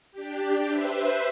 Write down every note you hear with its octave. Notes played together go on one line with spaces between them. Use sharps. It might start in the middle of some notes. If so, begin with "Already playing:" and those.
D4 G4
B4 C5 E5